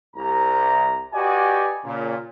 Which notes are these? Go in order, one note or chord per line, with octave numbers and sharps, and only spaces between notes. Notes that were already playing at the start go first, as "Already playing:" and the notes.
C2 A#5
F#4 G4 B4 D5 D#5 G#5
A#2 C#3